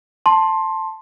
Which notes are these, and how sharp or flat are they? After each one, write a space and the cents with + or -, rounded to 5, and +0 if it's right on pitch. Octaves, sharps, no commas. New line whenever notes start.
A5 +0 C6 +15